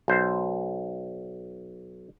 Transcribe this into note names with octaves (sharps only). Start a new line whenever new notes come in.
B1 C5